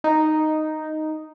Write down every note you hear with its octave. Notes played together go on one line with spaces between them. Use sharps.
D#4